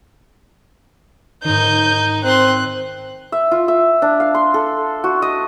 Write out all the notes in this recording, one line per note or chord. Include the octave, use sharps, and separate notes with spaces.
G#2 D#3 D#4 G6
C4 C6 F#6
E5
F4
E5
D4
F5
C6
A4
F#4
D#5